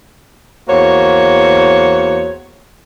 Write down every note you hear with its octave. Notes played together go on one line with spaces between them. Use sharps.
E2 A#3 F#4 C5 C#5